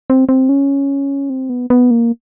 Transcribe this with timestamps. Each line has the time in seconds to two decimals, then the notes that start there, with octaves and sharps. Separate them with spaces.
0.10 C4
0.29 C4
0.49 C#4
1.30 C4
1.50 B3
1.70 B3
1.91 A#3